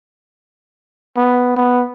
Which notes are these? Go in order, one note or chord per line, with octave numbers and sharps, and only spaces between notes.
B3
B3